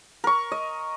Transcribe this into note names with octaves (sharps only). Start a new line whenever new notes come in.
A#4 C#6
D#5